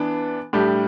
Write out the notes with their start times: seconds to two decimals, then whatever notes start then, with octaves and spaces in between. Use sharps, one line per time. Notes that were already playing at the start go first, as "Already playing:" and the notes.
Already playing: E3 B3 D4
0.53 A2 G3 D4 G4